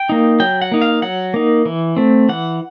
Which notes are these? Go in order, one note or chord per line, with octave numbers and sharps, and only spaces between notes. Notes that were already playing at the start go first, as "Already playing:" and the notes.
Already playing: G5
A#3 D#4
F#3 G5
F#5
A#3 D#4
F5
F#3 F#5
A#3 D#4
E3
A3 C4
E3 F#5